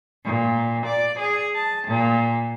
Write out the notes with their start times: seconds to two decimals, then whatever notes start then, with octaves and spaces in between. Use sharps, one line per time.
0.23 A#2
0.84 D5
1.17 G#4
1.54 A5
1.86 A#2